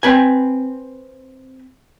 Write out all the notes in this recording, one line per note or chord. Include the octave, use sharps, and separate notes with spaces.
C4 B4 G#5